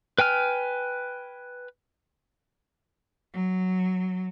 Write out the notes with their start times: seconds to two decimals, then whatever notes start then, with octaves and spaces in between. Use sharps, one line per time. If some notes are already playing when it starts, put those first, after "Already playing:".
0.18 B4 G5 G#5 F6
3.33 F#3